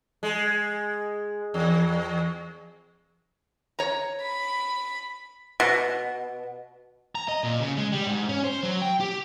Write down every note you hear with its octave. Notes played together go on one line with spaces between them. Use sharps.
G#3
E2
C#5 A#5
B5
B2
A#5
D#5
A#2
C#3
G#3
G3
G#2
C#4
C5
F#3
G5
G4